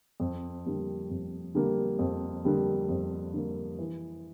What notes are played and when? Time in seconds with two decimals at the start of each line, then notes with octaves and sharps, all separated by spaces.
0.20 F2
0.65 D3 G3 A#3
1.10 F2
1.55 D3 G3 A#3
1.99 F2
2.44 D3 G3 A#3
2.89 F2
3.34 D3 G3 A#3
3.78 E3